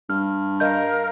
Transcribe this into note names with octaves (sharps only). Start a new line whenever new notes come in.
G2 F6
A#4 D#5 F5 G6